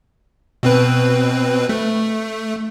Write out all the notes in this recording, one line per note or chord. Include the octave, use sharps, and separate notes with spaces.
B2 C4 B4
A3